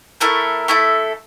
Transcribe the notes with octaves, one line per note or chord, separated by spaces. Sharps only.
A3 E4 A4 A#4
A3 E4 A4